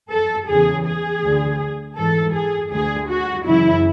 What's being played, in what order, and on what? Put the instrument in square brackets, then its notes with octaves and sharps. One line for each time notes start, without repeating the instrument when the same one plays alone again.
[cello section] A4
E2 C#3 E3 G#4
G#4
D2 D3
G#2 E3 A4
G#4
D2 D3 G#4
F#4
F#2 C#3 E3 E4